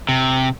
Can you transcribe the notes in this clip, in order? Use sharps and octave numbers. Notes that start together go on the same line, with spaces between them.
C3